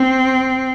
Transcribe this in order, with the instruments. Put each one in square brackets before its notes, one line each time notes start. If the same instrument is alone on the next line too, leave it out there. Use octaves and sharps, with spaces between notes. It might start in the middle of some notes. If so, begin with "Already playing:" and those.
Already playing: [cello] C4